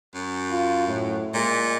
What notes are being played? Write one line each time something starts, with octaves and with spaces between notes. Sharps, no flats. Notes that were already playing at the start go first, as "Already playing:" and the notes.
F#2
F4
A2
A#2 G#3